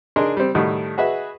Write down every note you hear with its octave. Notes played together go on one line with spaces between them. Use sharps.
D4 D#4 G#4 A#4 C6
G3 C4
A2 D#3 G3 F#4 D#6
F#4 G#4 B4 D#5 E5